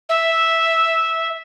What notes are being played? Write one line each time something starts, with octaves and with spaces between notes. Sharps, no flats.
E5